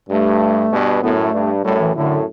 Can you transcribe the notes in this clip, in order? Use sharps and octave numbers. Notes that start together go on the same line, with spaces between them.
G2 A3
G2 B2
F#2 A2 B3
A3
G2
F#2 A2 G3
E3
F#2 A2 D3